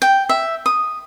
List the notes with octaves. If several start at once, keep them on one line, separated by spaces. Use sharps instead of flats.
G5
E5
D#6